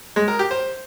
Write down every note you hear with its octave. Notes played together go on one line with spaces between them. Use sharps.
G#3
A#4
G4
C5